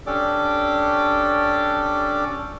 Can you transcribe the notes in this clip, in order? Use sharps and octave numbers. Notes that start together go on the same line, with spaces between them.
C#4 D4 G4 A4 D5 D6